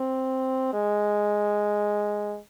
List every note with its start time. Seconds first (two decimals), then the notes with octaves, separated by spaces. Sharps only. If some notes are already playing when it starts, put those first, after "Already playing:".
Already playing: C4
0.73 G#3